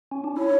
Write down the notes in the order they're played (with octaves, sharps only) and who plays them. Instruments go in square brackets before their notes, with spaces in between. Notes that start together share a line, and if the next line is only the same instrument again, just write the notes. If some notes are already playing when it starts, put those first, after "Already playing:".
[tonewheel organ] C#4
D4
[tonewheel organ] E4 [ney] C#5